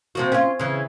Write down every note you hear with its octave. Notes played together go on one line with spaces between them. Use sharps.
C3 F3 F#4
C#4 F4
C#3 E3